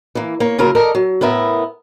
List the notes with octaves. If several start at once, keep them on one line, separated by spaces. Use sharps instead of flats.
E3 A#3
A#3 C#5
C#3 F#3 A#3 F4 A#4
A4 A#4 D5 D#5
F#3
A2 B3 A#4 E5